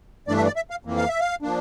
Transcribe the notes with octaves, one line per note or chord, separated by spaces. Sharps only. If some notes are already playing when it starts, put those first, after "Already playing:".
G2 E3 A3 D4 D5
E5
D5
E5
F5
F2 E3 A#3
F5
E5
F5
F3 A#3 D4